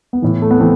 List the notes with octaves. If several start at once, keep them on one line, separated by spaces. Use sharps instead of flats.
B3
A2 E3
A3
B3
E3 A3 C4